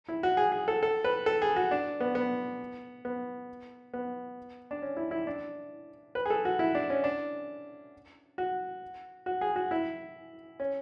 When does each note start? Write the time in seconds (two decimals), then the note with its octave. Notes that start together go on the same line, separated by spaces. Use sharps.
0.08 E4
0.23 F#4
0.37 G#4
0.52 G#4
0.68 A4
0.83 A4
1.04 B4
1.26 A4
1.42 G#4
1.56 F#4
1.71 D4
2.00 B3
2.15 B3
3.05 B3
3.94 B3
4.71 D4
4.82 C#4
4.97 E4
5.11 E4
5.27 D4
6.15 B4
6.26 G#4
6.30 A4
6.45 F#4
6.59 E4
6.75 D4
6.90 C#4
7.04 D4
8.38 F#4
9.26 F#4
9.41 G#4
9.56 F#4
9.71 E4
10.60 C#4